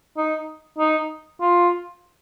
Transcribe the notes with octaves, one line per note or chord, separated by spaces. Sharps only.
D#4
D#4
F4